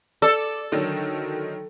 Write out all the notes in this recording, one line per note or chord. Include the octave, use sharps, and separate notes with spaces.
A4 D5
D3 D#3 F#3